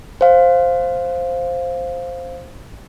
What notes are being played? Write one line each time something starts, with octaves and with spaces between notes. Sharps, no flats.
C5 F5